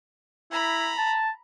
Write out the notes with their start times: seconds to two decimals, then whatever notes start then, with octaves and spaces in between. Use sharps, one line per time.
0.52 E4 A#5 B5
0.98 A5